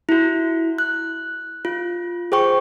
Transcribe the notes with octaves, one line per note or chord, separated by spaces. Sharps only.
E4 F#4
F#6
F4
G#4 C5 G5 C#6